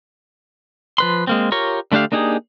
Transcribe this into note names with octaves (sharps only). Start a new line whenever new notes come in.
F3 B4 C6
G#3 A#3 C4
F4 G4 A#4 C#5 C#6
D3 A3 D4 G4 F5
A#3 D4 D#4 G4 G#4